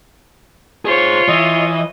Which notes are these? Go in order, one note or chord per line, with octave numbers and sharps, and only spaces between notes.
F4 G#4 C5 C#5
E3 D#5